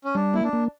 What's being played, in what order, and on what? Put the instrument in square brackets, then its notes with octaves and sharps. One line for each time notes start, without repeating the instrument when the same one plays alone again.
[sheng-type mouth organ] C#4
[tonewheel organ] G3 [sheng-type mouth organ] D4
[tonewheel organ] A#3 [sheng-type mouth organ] E4
[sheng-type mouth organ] D4
[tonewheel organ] A#3